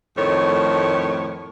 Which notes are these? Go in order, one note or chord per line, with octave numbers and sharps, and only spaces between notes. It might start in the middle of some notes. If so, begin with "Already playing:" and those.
F2 A2 D#3 A3 C#5